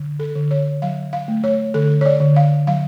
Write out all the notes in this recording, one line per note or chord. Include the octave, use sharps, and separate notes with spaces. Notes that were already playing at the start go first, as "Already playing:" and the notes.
Already playing: D3
A4
D3
C#5
F#3 F5
F5
A3
C#5
D3 A4
C#5
D5
D3
F5
F#3 F5